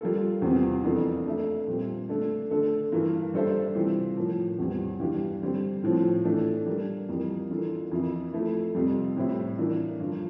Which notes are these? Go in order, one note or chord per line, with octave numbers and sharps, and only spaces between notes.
G3 A#3 F4 A4
E2 C3 G3 C4 F4
F2 E3 A#3 D4 A4
A3 D4 A4 E5
A#2 G3 C4
D3 A3 D4 A4
D3 A3 D4 A4
G2 E3 A#3
G3 D4 A4 C5 E5
C3 E3 G3 C4 F4
A2 F3 A#3
E2 C3 G3 C4
G2 E3 G3 D4 G4
D3 G3 C4
A2 F3 C4
E3 A3 D4
G3 A#3 D4
F2 E3 G3 A#3
E3 A#3 D4 F4 A4
F2 E3 A#3 E4
F3 A3 E4
F2 C3 G3
A2 G3 C4 E4
E3 A#3 D4
G2 D3 F3